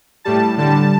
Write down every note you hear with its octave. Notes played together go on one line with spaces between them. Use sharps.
A2 G3 A5
D3 G3 A5